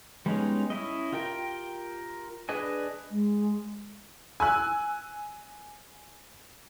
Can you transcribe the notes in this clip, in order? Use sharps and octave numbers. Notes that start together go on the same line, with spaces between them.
G3 G#3 B3 C#4 D#4
C#4 E4 D#5
F4 G4 A#4 G5
D4 G#4 B4 D#5 G#5
G#3
G#5 E6 F#6